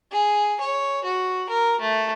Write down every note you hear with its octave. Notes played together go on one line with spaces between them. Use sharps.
G#4
C#5
F#4
A#4
A3